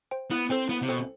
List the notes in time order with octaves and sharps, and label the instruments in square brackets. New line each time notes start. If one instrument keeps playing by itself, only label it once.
[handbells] C5 G5
[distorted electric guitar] B3 [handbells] E4
[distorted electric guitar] C4 [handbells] A4 C5 G5
[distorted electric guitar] B3 [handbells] E4
[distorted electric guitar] C3
[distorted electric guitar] B2 [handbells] A4 C5 G5